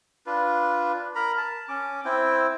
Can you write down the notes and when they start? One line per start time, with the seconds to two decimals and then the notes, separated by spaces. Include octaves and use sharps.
0.26 D4 F4 B4
1.15 A#4 A#5 B5
1.37 A5
1.69 C#4 D6
2.05 C4 E4 G5